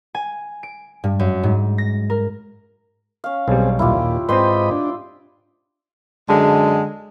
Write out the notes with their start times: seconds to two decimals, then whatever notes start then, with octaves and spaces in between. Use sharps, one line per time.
0.15 G#5
0.63 D7
1.04 G2
1.19 F#2
1.43 G#2
1.78 A#6
2.10 A#4
3.24 C#4 F5
3.48 B1 G3 C4 G#4
3.79 D#2 A#2 E4 F4 G4
4.29 G#2 C4 B4 D5 D#5 G5 B5 C6
4.71 D4
6.28 F#2 D3 G#3